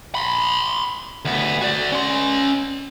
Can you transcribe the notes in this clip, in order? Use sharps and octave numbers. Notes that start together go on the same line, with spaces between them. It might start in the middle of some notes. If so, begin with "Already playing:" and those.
B5 C6
D2 B3
F#4 D5
C#4 C6